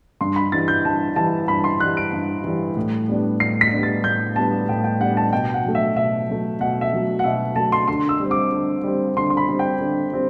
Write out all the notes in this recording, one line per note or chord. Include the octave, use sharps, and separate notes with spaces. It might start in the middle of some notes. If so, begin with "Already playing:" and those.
G2 C6
B5
E3 G3 A6
G6
G2 A5
E3 G3 A5
G2 B5
C6
E3 G3 F#6
D7
G2
E3 G3
A2
G3 B3 D4
A2 C7
B6
G3 B3 D4
A6
A2 G6
G3 B3 D4 A5
A2 G5
G5
G3 B3 D4 F#5
A5
B2 G5
F#5
F#3 A3
E5
B2 E5
F#3 A3
B2 F#5
E5
F#3 A3
F#5
B2 E5
F#3 A3 A5
C6
D3 C6
E6
G3 C4
D6
D3
G3 C4
D3 C6
C6
B5
G3 C4
G5
D3
G3 C4